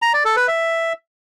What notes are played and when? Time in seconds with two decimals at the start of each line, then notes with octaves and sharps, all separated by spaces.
0.02 A#5
0.14 D5
0.25 A4
0.36 B4
0.48 E5